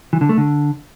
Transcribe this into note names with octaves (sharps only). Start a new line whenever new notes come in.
E3
D3
A3
D3